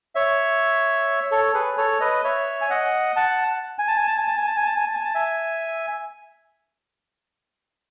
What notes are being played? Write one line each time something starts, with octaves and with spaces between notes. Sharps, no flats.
C#5 E5
A4 C#5
G#4 B4
A4 C#5
B4 D#5
C#5 E5
G#5
D#5 F#5
F#5 A5
G#5
A5
G#5
A5
G#5
A5
G#5
A5
G#5
A5
G#5
A5
G#5
A5
E5 G#5